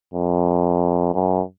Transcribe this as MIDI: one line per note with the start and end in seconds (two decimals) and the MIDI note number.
0.14 1.12 41
1.14 1.42 42